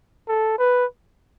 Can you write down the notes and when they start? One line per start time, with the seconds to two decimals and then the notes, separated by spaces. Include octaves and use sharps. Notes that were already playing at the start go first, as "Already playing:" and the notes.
0.28 A4
0.59 B4